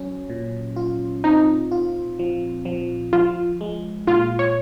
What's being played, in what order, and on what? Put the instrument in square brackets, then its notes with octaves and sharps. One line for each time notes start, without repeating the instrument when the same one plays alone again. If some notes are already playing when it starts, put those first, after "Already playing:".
Already playing: [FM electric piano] F#3 C#4
A#2
F4
[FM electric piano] C4 [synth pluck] D#4
[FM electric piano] F4
F3
F3
[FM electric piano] F3 [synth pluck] F4
[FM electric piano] G#3
[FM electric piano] A#2 [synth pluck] F4
[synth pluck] C#5